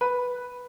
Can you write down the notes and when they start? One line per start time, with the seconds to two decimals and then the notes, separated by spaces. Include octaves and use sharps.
0.01 B4